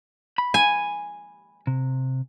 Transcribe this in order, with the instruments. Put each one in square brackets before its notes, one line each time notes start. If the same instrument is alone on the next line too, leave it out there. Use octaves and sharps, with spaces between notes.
[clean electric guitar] B5
[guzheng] G#5
[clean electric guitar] C3